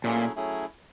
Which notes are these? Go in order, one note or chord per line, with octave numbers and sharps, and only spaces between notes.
A#2 F#3 A3 C#4 E4 G#4
F#3 A3 C#4 E4 G#4